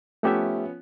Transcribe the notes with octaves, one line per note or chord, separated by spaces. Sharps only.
F3 A3 B3 C#4 G4 E5